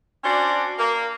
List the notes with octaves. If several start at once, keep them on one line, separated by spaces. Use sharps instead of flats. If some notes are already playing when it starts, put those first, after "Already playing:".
C#4 D4 F#4 C5 D5
A#3